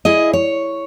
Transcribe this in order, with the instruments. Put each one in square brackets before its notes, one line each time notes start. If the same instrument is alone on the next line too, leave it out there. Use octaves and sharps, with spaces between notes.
[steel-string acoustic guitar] E4 G#4 D#5
C#5